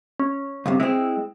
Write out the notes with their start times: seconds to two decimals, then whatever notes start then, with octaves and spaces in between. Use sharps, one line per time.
0.20 C#4
0.66 C#2 G2 C3
0.80 G#3 C4 E4